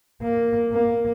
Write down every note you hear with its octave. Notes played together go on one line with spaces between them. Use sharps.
A#3
A#3